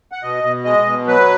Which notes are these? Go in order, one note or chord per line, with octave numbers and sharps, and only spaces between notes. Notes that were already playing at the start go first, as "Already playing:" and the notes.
F#5
B2 D#5
B2
G#3 D#5
B2
F#3 B4